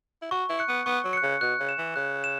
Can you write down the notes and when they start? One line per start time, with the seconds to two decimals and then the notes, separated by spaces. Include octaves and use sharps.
0.22 E4
0.31 F#4 C#6
0.49 E4
0.59 F#6 C#7
0.68 B3
0.86 B3 C#6
1.04 F#3
1.13 F#6 C#7
1.23 C#3
1.41 B2 F#6
1.60 C#3
1.69 E7
1.78 E3
1.96 C#3 F#6
2.24 E7